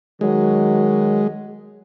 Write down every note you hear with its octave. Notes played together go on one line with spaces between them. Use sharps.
D#3 F#3 G#3